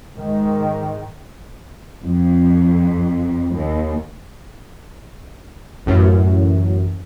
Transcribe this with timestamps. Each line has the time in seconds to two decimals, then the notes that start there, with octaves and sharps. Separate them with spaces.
0.15 G#2 D#3
2.03 F2
3.54 D#2
5.86 A1 F#2